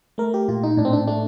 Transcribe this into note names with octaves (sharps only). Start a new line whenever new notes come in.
A3 A#4
G4
A#2 F4
D#4
A2 D4
C4
D4
A3 D4